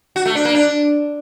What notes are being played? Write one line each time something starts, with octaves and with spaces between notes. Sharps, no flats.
F#4
A3
D4
A#3
D4